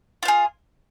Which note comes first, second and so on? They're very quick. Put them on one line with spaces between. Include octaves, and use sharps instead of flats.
F4 F5 G#4